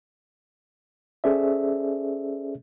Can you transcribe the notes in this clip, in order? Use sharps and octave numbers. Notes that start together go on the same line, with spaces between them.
C#4 G#4 A4 C5 D5 E5